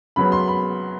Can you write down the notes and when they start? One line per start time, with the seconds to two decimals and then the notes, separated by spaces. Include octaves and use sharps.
0.16 C#3 F#3 B3 B5
0.32 C6
0.48 B5